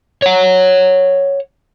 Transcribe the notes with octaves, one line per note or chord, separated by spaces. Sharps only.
C#5 F#5